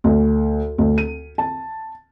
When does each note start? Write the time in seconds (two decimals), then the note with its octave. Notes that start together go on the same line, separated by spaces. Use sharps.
0.04 D2
0.78 D2
0.98 D#7
1.38 A5